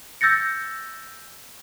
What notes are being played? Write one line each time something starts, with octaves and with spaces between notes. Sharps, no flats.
E6 G6 A6 A#6 C#7